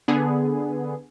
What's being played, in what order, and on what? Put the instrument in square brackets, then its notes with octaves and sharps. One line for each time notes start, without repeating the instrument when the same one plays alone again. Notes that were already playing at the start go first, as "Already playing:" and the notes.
[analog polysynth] D3 B3 G#4